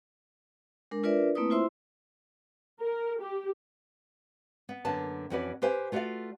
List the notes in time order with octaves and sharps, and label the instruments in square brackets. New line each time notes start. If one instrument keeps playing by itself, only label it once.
[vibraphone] G#3 D4 A#4
D4 F4 A#4 B4 D5 E5
A3 A#3 C4 E4 B4 D#6
E4 F4 C5 E5 C6 E6
[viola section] A#4
G4
[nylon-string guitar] B3
F#2 D3 A#3 B3 A5
F2 E3 C#4 F#4 B4 D5
G4 B4 C5 F5 G#5
A3 F4 F#4 C5 D5 F5